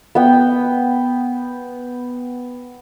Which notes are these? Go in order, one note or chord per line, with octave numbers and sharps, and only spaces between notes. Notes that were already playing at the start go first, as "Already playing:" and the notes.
B3 G5